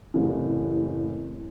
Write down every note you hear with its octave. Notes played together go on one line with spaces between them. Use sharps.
F#1 A2 C3 E3